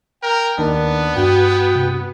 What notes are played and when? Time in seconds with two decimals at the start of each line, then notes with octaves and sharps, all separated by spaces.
0.23 A#4 G5
0.58 D#2 D#3 B3 D4
1.16 G2 F#4 G5
1.71 G2 C3